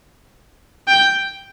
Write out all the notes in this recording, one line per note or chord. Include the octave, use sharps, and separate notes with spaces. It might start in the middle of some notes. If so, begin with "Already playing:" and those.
G5